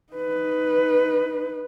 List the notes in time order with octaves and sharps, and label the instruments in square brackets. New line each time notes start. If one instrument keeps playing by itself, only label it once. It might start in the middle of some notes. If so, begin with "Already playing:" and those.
[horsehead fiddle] D#4 B4